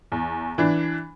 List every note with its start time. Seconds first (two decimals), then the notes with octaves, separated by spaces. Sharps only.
0.12 E2
0.58 E3 D4